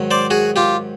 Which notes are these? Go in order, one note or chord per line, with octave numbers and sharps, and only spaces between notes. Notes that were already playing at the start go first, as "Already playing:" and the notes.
Already playing: G#2 D#3 F#3
C5 D5
F#4 G#4
F4 G4